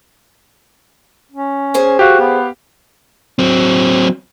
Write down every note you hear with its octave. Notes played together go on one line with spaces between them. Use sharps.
C#4
G#4 C5 G#5
F#4 G4 F5
B3
F#3 C4